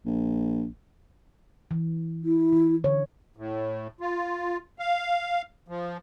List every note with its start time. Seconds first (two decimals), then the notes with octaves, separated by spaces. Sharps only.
0.06 A#1
1.71 E3
2.23 E4
2.53 E3
2.84 D3 C#5
3.37 A2
4.00 F4
4.79 F5
5.68 F3